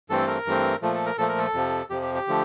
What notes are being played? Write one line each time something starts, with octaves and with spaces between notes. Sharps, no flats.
G2 E3 A3 C4 A4
A#4
G2 E3 A3 C4
A#2 F3 A3
A4
A#4
A#2 F3 A3 A4
A#4
A4
F2 C3 F3
F2 C3 F3 G4
G4
G4
D3 F3 A3